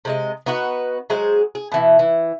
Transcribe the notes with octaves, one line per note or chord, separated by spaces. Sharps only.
C3 G#3 D#5
B3 D#4 F#4 B4
F#3 G#3 G#4 C5
G#4
B2 E3
E3